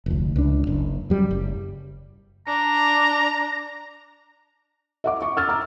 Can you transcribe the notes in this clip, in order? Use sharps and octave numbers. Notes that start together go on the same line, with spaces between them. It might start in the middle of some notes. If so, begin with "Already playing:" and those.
F1 D2
C#2 D4
F#1
F#2 G3
F#1
D4 A#5
E5 F#5 D6
C#6
E6 F6 A6
A#5 F6